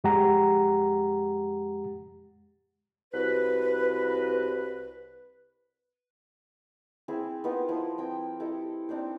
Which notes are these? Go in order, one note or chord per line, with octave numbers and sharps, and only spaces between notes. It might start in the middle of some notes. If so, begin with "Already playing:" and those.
F2 G#3 G4 F#5 A#5
C2 F#4 B4
C4 E4 G#4 G#5
B3 D#4 F4 A#4
F3 E4 C6 D#6
C4 G5
E4 G4 A4 D#5
C4 D4 D#4 C5